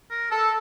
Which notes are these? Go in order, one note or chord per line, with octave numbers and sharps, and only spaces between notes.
A#4
A4